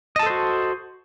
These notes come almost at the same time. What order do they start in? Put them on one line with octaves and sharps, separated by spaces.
D#5 A5 A4 C5 F#4